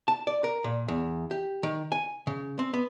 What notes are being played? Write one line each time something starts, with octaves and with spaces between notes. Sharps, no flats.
A5
D5
A#4
A#2
E2
G4
D#3
G#5
C#3
C4
B3